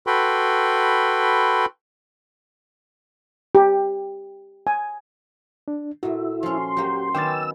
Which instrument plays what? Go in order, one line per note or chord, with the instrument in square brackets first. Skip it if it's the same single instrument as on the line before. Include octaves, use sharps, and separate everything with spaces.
[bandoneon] F#4 A4 B4 G5 B5 C6
[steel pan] G4
G#5
[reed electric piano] D4
[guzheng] A#2 A3 [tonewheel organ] E4 [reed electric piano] F#4
[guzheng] F3 C#4 [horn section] C6
[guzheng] F#3 A#3 [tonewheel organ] G4
[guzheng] D#3 B3 C#4 [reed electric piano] G5 D6 A6 [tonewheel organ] E6